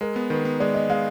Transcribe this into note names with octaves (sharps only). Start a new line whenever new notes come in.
G#3 A#4
B3
D#3 B4
B3
G#3 D5
B3 D#5
G#3 F5